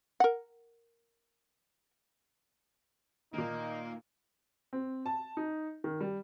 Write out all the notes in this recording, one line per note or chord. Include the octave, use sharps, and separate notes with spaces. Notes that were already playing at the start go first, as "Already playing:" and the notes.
A#4 F#5
A#2 D#3 A#3 D#4
C4
A5
D#4
D#3
G3